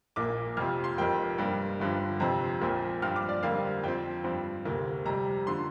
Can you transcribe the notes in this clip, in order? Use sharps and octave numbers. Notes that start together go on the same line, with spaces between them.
A#1 A#2 A#3 D6
F2 C3 F3 C4 F6
C6
F1 F2 C3 F3 A#3 G5
G2 G3 A#3
G1 G2 D3 F3
F2 C3 F3 C4 A#5
A#1 A#2 F3 C4
G2 F3 C4 F6
D6
D5
F2 D3 G3 A#3 F5
F2 F3 C4 G5
G2 F3 C4
D2 C3 A#3
F2 C3 G3 A#5
D3 F3 C6